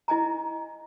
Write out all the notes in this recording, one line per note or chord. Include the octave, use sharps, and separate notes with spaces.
E4 D#5 G#5 A#5